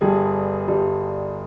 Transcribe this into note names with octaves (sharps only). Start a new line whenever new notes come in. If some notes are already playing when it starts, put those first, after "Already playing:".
G1 G2 G3 G#4
G1 G2 G3